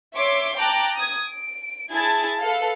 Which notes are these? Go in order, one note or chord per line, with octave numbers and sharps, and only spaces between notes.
C#5 E5 C6 D6
G5 A5 A#5 D6 F#6
D#6 G#6
D7
E4 G#4 A5 G#6 A6
A4 B4 F5